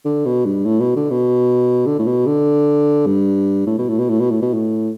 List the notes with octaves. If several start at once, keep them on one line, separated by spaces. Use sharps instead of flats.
D3
B2
G2
A2
B2
D3
B2
D3
A2
B2
D3
G2
A2
B2
A2
B2
A2
B2
A2
B2
A2